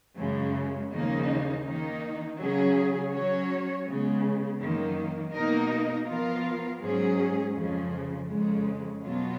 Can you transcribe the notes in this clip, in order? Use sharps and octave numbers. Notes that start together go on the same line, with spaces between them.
F#2 C#3 G#3
D#2 C#3 F3 A#3 D#4
D#3 A#3 D#4
C#3 F#3 C#4 G#4
F#3 C#4 F#4 C#5
C#3 G#3 B3
F#2 D#3 A#3
B2 A#3 D#4 A#4 D#5
F3 B3 F4 A#4 F5
G#2 F#3 C#4 G#4
F2 C#3 F3
F2 C#3 G#3
B2 F#3 B3 F4